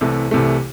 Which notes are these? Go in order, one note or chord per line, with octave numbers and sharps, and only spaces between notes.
C2 C3 E3 A3
C2 C3 E3 A3